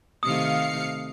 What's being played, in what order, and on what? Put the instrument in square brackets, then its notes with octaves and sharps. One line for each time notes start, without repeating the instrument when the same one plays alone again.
[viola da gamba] C3 D#3 A3 [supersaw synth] F5 C7 C#7 [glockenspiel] D#6